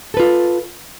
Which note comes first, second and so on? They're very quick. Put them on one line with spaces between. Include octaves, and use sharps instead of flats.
A4 B4 F4